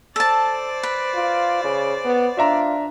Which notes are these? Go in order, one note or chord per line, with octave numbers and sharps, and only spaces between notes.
A4 C5 D5 A5
B4
F4
C#3
B3
D4 F4 E5 A#5